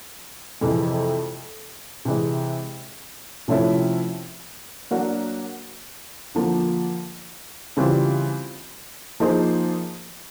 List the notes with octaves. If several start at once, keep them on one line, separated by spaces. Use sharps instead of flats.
F2 C3 E3 G#3
C3 E3 G#3
C3 F3 A3 C#4 E4
F#3 A#3 D4 F#4 A#4
D3 F3 A#3
C#3 E3 G3 C4 F4
F3 A#3 D#4 G#4 C5